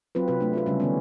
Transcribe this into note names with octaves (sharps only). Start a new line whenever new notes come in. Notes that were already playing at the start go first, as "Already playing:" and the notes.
F#3 C4 F4 B4
C3 C4 F#4 B4
A3 D4
C4 F4 B4
C#3 G3 C#4
D#3 B3 C#4